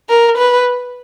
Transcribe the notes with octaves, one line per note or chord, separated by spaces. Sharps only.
A#4
B4